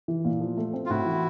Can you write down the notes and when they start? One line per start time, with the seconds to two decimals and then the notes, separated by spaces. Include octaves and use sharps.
0.08 E3
0.25 A#2
0.41 F3
0.57 A3
0.73 C4
0.86 F4
0.90 A2 E4 F#4
1.06 E3